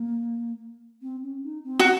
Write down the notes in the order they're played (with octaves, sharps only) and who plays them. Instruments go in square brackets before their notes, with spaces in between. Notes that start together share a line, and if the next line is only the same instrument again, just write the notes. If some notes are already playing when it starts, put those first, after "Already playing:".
Already playing: [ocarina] A#3
C4
C#4
D#4
C4
[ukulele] F#4